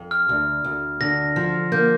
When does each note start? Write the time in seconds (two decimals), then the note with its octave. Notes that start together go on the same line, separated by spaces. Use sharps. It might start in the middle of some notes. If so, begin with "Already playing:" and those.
Already playing: F2
0.11 F6
0.29 D2
0.65 D2
1.01 D3 A#6
1.36 F3
1.72 A#3 G6